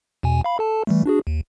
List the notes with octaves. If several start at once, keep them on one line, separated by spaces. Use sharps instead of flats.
E2 B2 G#5
F5 B5
A4 A5
E3 G3 A3
D4 F#4 G#4
D#2